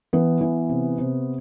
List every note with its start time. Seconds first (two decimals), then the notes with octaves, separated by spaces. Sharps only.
0.13 E3 B3
0.41 E3
0.69 C3
0.98 C3